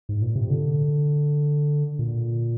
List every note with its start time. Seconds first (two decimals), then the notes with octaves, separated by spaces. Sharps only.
0.09 G#2
0.22 A#2
0.36 C3
0.50 D3
1.99 A#2